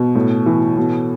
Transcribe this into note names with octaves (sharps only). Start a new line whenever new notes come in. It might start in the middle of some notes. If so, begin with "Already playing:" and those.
Already playing: B2
A2
E3
B2